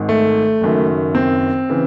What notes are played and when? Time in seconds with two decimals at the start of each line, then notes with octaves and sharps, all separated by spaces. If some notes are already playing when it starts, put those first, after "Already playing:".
Already playing: G#1 G#2 D#3
0.09 A3
0.61 F#1 F#2 D#3
1.15 C4
1.69 C#3 E3